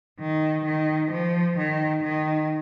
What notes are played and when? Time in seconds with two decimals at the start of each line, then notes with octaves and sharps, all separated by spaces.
0.20 D#3
0.65 D#3
1.11 F3
1.58 D#3
2.04 D#3